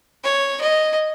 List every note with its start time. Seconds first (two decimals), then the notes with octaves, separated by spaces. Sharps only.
0.23 C#5
0.61 D#5